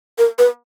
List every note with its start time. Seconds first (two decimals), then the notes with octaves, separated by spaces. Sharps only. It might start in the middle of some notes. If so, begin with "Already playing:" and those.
0.18 A#4
0.39 B4